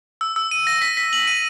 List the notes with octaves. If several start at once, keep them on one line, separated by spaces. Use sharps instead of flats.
E6
E6
D#7
A#6
B6
B6
F#7
D#7